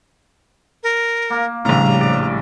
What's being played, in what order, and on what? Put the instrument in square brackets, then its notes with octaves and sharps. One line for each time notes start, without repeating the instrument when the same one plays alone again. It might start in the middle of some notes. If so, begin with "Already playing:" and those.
[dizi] A#4
[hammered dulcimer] A#3
[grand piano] A#1 A2 [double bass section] C#3 G3 [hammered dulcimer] F5 [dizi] A#5
[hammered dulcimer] D5